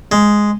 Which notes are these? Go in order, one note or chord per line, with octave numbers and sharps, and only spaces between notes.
G#3